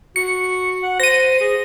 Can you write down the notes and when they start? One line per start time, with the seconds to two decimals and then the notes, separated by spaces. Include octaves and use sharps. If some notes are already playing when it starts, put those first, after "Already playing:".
0.16 F#4 C#7
0.83 F#5
1.00 C5 A#6 D#7
1.41 G#4